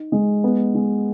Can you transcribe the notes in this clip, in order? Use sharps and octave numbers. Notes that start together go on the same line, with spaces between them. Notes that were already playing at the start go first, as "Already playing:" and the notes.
Already playing: D#4
G#3
B3
G#3